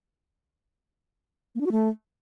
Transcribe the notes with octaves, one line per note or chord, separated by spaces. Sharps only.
A#3
D4
F#4
A3